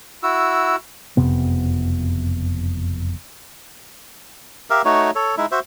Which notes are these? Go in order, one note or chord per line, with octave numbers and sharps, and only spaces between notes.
E4 F#4 E6
F#1 F2 C3 B3
G4 A#4 E5 F5
A3 D#4 F#4 C#5
A4 C#5
G#3 D#4 E4 E5
F#4 C5 E5